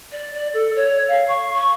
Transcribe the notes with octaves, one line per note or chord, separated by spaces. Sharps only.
D5
D5
A4
C#5
F5
C#6
C#6